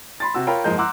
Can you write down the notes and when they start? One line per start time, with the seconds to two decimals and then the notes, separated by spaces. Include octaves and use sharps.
0.20 B5 C6 A6
0.34 C3 F#4 E6
0.47 F4 A#4 C#5 F5 G5 B5
0.64 F#1 G#2 F3 G#3 A#4 G6
0.78 F#5 A#5 C6 D6 E6 F#6